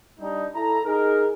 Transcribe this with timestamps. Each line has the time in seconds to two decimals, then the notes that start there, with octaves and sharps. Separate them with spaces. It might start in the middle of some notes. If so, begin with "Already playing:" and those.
0.20 G3 D4 D#4
0.55 E4 A4 A#5
0.85 D#4 G#4 A#4